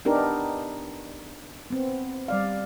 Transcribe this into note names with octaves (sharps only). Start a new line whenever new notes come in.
B3 D4 D#4 G4 A#4
B3 C4
G3 D5 F5